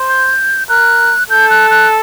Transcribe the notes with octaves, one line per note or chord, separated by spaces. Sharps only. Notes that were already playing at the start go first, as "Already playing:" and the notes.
Already playing: C5
G6
A#4 F#6
A4 G6
F#6
F#6